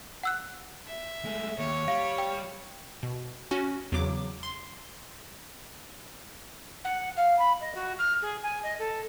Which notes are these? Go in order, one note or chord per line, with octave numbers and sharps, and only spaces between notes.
F#5 E6 F#6
E5
G#3 A3
D#2 C#5
G3 F5
G5
B2
C#4 F#4
E2 C#3 F#3 D6
C6
F#5
F5
B5
D#5
F#4
F6
G#4
G#5
D#5
A4